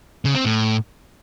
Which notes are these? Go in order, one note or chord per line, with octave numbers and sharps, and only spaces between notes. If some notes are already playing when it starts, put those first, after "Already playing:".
C#3
C4
A2